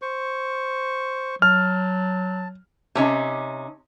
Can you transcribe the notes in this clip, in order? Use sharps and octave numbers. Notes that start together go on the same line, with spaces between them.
C5 C#6
F#3 A5 F6
C3 C#4 D#4